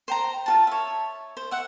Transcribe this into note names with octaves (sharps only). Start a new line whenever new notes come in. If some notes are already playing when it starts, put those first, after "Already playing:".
C5 G5 A#5
F4 F#4 A5
C#5 E5
C5
E5 F#5